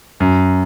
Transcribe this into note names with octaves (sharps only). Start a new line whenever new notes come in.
F#2